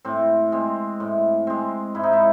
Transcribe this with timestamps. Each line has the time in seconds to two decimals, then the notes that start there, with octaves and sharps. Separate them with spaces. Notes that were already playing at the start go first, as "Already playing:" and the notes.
0.05 A2 C4
0.52 G#3 C4
1.00 A2
1.47 G#3 C4
1.95 G#2 E4
2.03 D#4
2.13 E4